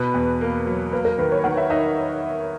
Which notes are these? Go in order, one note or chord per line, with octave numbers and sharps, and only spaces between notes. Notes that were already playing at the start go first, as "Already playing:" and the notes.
Already playing: B2 B4
E2
A#3
F#3
A#3 B4
A#4
D#3 B4
C#5
D#3 F#5
E5
D#4 E5